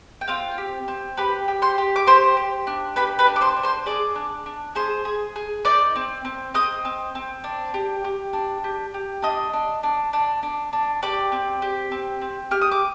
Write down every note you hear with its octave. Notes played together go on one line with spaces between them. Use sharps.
G5
C4 F4 F5
G4
C4
G4 B4 B5
G4
C5 C6
G4
D6
G4 C5 C6
G4
D4
G4 B4 B5
B4 B5
D4
D6
C5 C6
D4
C5 C6
G#4 D5 D6
D4
D4
G#4 C5 C6
G#4
G#4
D#4 D5 D6
C4
C4
C4 D#5 D#6
C4
C4
D4
G4
G4
D4
G4
G4
D4 D#5 D#6
D4
D4
D4
D4
D4
G4 D5 D6
C4
G4
C4
C4
G4 F6
D#6
D6